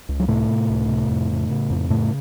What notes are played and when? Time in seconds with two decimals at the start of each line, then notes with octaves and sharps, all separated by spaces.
0.09 C#2
0.20 F#3
0.28 A2 C3 A3
0.49 C3
0.69 C#2
0.89 C3
1.09 F2
1.30 C#3
1.50 C#3
1.70 F2
1.90 A2 C#3 A3